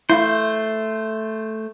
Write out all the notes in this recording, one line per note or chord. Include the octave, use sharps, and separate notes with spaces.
A3 E4 C5 F5